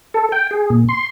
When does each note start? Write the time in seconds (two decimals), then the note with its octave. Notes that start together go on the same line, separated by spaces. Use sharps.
0.14 A4
0.32 G5
0.51 G#4
0.70 A#2
0.89 C6